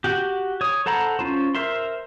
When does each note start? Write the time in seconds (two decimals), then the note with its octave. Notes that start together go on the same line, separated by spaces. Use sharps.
0.04 F#4 G4
0.61 C#5 D#6
0.86 A4 C5 F#5 A#5 B5
1.19 C#4 F4 C5
1.55 A#4 C5 E5 C6